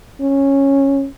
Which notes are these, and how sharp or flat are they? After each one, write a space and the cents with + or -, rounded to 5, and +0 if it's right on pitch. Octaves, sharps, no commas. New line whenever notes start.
C#4 -10